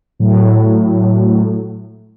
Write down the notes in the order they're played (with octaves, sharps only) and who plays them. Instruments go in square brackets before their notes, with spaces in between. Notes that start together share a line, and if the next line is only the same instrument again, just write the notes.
[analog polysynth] A2 F#3